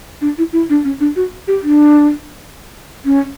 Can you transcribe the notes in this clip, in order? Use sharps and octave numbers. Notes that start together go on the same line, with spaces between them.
D4
E4
E4
D4
C#4
D4
F#4
G4
D4
C#4